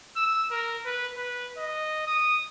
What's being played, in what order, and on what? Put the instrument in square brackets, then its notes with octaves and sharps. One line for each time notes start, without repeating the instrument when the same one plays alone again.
[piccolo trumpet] E6
A#4
B4
B4
D#5
D#6